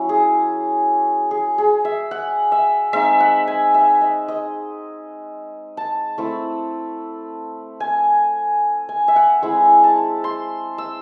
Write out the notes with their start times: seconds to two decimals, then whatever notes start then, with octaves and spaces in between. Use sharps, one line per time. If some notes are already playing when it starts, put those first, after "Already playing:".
Already playing: F#3 C#4 E4
0.09 G#4
1.31 G#4
1.58 G#4
1.85 E5
2.11 F#5
2.52 E5
2.93 G#3 C4 D#4 E5
3.20 F#5
3.48 G#5
3.74 E5
4.01 D#5
4.28 D#5
5.77 A5
6.18 A3 C4 E4
7.80 G#5
8.89 G#5
9.08 E5
9.16 F#5
9.42 G#3 C4 E4 G#5
9.84 A5
10.24 C6
10.78 E6